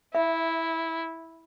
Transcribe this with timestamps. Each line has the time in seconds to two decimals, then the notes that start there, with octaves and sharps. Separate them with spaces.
0.15 E4 E5